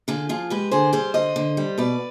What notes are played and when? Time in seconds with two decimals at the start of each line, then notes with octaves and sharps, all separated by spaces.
0.08 D3 F4 G#4
0.29 F3 F4 G#4
0.50 G#3 G4 B4
0.71 D3 G#4 C5
0.93 G3 G#4 C5
1.14 D3 C5 D#5
1.36 D3
1.57 G3
1.78 B2 B4 D5